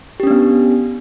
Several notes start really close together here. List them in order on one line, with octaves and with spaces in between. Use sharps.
G4 C#4 D4 B3